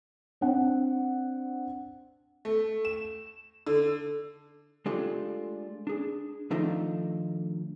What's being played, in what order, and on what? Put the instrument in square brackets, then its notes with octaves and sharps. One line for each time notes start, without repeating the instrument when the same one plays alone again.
[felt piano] C4 D4 F#5
[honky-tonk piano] A3
E7
D3
[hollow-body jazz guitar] G#3 A3 D4 F4 G4 A4
D4 G#4
D#3 F3 A3 D4 D#4